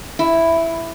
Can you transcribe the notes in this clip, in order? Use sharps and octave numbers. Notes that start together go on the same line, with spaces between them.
E4